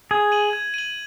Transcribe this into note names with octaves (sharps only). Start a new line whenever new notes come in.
G#4 G#6
D#7 F#7
G#6
D#7 F#7